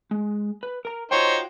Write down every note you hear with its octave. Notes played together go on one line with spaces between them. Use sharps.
G#3
B4
A#4 A#5
D#4 F4 F#4 C5 C#5 G5